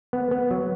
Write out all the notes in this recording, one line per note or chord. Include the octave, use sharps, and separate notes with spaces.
B3
B3
F#3